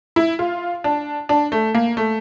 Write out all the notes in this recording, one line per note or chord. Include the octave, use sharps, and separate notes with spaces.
E4
F4
D4
D4
A3
A#3
A3